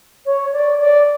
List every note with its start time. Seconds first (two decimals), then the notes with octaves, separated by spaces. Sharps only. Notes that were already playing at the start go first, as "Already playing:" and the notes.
0.25 C#5
0.52 D5
0.80 D5